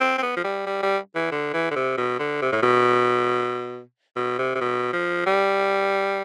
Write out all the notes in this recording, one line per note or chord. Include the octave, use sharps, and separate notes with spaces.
C4
C4
B3
F3
G3
G3
G3
E3
D3
E3
D3
C3
B2
D3
C3
A2
B2
B2
C3
C3
B2
F3
G3